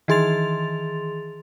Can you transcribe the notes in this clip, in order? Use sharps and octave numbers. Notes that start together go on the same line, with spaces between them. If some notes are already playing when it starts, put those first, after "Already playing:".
D#3 E3 G#4 C6 A6 F7